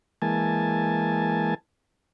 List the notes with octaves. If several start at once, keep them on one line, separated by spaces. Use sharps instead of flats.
E3 G#3 A#3 G#5 A5